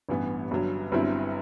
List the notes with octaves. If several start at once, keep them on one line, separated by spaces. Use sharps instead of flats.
A1 G2 E3 B3
G1 G2 F#3
G1 G2 F#3 C4 E4